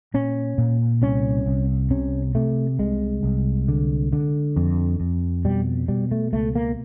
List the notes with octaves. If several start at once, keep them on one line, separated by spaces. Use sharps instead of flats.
A#2 C#4
A#2
C2 C#4
C2
C3 C#4
C3 A3
C2 G#3
C2
D3
D3
F2
F2
B2 G3
B2 G3
A3
C#2 A3
A#3